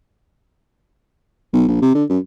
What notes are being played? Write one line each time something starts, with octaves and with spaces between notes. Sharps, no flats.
B1
A#1
C3
D3
F#2